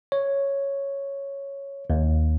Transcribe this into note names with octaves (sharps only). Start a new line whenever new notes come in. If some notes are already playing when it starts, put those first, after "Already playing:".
C#5
D#2